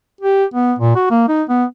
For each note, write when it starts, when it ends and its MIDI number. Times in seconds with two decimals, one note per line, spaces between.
0.21 0.44 67
0.54 0.73 59
0.79 0.95 46
0.96 1.07 66
1.10 1.25 58
1.28 1.43 63
1.49 1.64 59